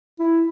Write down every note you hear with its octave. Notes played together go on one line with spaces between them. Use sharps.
E4